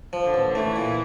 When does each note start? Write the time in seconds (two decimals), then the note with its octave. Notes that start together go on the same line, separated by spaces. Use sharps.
0.13 F3
0.24 D3
0.34 A1
0.55 E3 A3
0.76 A#2